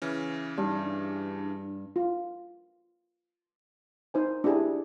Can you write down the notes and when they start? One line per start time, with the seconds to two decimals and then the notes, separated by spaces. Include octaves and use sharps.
0.02 C#3 E3 C#4
0.57 G2 D#4
0.84 D4
1.96 F4
4.14 D#4 C5 G#5
4.44 D4 E4 G4 G#4